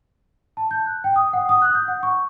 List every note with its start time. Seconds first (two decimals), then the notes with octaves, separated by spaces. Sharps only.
0.57 A5
0.71 G6
0.86 F#6
1.04 G5
1.16 D#6
1.33 F#5
1.49 D#6
1.62 F#6
1.75 G6
1.88 F#5
2.03 C#6